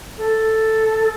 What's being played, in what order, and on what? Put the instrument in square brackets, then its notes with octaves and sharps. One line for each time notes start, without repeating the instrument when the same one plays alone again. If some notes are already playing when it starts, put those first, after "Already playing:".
[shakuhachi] A4